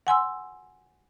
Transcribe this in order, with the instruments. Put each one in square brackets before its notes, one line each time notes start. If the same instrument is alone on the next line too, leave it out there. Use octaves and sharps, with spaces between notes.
[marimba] F#5 G#5 C6 E6